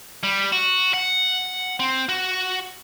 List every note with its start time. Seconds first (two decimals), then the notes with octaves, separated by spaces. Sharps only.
0.23 G3
0.52 F#4
0.94 F#5
1.80 C4
2.09 F#4